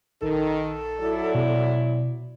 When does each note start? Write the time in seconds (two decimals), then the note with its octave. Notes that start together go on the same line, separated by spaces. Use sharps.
0.22 A#1 D#3 A4
1.00 F#3 E4 D5
1.35 B2